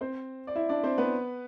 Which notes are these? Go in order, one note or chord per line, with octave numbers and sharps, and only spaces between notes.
C4 C5
D5
E4 E5
D4 D5
C4 C5
B3 B4